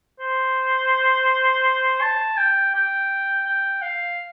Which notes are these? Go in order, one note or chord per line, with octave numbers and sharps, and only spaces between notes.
C5
A5
G5
G5
G5
F5